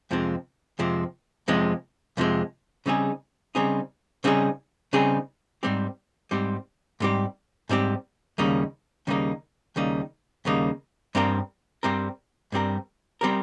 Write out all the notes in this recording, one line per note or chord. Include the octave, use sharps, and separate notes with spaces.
F2 C3 F3 G#3 C4
F2 C3 F3 G#3 C4
F2 C3 F3 G#3 C4
F2 C3 F3 G#3 C4
C#3 G3 C4 D#4 G#4
C#3 G3 C4 D#4 G#4
C#3 G3 C4 D#4 G#4
C#3 G3 C4 D#4 G#4
G#2 G3 C4 G4
G#2 G3 C4 G4
G#2 G3 C4 G4
G#2 G3 C4 G4
D#2 C#3 G3 A#3 D#4
D#2 C#3 G3 A#3 D#4
D#2 C#3 G3 A#3 D#4
D#2 C#3 G3 A#3 D#4
G2 G3 C4 G4 A#4
G2 G3 C4 G4 A#4
G2 G3 C4 G4 A#4
G3 C4 G4 A#4